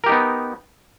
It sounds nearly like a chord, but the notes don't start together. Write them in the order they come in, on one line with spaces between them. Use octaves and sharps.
A#4 G4 D#4 B3